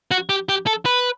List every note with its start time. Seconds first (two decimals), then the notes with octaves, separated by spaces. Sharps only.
0.11 F#4
0.29 G4
0.49 G4
0.67 A4
0.86 B4